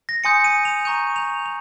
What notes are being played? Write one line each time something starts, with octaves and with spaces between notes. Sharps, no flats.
A#6
G#5 C6 D#6 G6 C#7
D#7
F7
A#5 C#6 G6 D#7
F7
F7